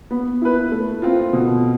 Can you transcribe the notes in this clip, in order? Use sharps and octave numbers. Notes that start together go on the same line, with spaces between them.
B3
E4 B4
A3
C4 F4
B2